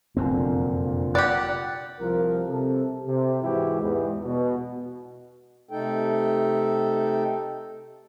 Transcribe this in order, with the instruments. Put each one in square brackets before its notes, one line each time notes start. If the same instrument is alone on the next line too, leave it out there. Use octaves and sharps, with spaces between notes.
[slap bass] F1 F#2 C4 [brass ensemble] A#2 D3
[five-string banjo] G4 D5 [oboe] F#5
[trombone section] C2 F3 F4 A#4
C3 A4
C3
G#2 E3 G#3 E4 F#4 G4
E2 G#2
B2
[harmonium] C3 A3 D#4 A4 G5